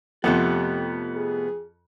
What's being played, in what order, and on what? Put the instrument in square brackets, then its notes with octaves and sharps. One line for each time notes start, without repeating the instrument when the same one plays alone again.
[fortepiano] F2 [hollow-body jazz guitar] C3 A3 B3 [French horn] G4
[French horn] G#4